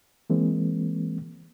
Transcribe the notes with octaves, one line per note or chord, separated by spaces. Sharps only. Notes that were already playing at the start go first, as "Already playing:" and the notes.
E3 G#3 A#3 C4